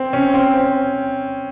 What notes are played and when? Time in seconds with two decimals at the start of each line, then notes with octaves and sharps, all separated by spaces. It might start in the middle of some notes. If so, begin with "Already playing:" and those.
Already playing: C4
0.13 C#4
0.34 C4
0.54 C4